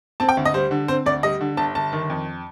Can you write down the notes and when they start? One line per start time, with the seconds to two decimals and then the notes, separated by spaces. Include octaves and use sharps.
0.20 C4 A5
0.29 G5
0.37 D2
0.45 D#5
0.54 G3 C5
0.71 D3
0.88 C4 C5
1.06 D2 D5
1.23 G3 D#5
1.41 D3
1.57 G1 A5
1.75 G1 A5
1.92 D#3
2.10 F2